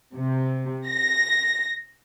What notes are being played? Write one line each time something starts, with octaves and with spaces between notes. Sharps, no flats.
C3
A#6